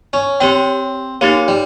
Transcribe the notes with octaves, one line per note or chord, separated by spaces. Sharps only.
C#4
C4 G4 C#5 G5
A#3 D#4 G4 C#5
G3